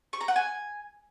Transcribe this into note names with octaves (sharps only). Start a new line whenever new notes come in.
C#6
A#5
F#5
G#5